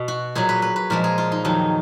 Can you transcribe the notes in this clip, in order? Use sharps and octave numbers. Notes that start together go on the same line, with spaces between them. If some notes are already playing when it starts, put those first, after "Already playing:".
Already playing: B2
F#4
A#2 F#3 G#4
B4
B4
B4
A#2 F3 G#3 A#4
G#4
F4
D#4
F2 D#3 F#3 D#4